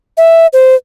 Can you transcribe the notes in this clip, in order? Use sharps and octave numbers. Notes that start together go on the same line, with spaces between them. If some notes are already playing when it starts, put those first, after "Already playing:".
E5
C5